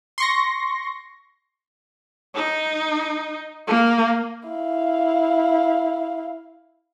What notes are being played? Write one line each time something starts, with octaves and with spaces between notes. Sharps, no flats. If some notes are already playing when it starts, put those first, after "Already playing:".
C6 C#6 A#6
D#4
A#3
E4 F5